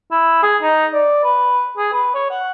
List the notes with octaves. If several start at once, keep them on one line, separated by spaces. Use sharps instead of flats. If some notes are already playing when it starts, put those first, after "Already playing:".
E4
G#4
D#4
D5
B4
G#4
B4
C#5
F#5